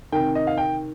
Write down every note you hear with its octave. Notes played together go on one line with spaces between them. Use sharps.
C3 D#3 G5
D#5
F5
G5